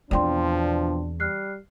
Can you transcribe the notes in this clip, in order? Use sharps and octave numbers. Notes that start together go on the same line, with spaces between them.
E2 B2 F3 C4 D4 D5 G5 C6
G3 F6 F#6 C7